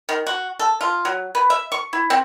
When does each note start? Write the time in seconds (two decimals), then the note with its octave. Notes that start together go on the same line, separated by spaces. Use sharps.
0.09 D#3
0.27 F#4
0.59 A4
0.81 F4
1.05 F#3
1.35 B4
1.50 E5
1.72 C#6
1.93 E4
2.10 C4